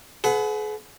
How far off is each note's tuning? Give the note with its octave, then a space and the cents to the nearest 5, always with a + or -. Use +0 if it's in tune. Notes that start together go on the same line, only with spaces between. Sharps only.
G#4 +45 B4 +25 F#5 -20